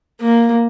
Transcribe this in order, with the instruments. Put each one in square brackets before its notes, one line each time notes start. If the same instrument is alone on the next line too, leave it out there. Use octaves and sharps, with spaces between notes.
[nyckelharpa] A#3